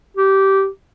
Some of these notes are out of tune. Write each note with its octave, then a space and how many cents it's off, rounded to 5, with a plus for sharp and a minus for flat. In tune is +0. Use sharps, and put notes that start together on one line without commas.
G4 -15